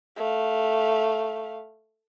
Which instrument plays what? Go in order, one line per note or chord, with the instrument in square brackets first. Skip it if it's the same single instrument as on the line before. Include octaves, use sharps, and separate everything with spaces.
[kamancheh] A3 F5